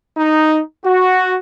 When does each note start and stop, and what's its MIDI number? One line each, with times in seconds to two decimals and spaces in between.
0.17 0.59 63
0.84 1.37 66